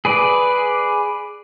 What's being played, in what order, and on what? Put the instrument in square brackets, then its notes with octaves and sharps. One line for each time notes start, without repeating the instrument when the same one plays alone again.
[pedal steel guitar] G#4 B4 D5